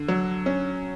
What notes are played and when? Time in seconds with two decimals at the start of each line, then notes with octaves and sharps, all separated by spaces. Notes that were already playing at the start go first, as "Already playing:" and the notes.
Already playing: D3
0.09 F#3
0.46 C#4